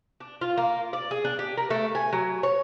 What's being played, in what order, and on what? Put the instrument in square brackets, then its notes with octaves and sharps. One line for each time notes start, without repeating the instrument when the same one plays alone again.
[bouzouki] D4
F4
A#3
D5
G#4
D4
G4
A#4
A3
G#5
F#3
C#5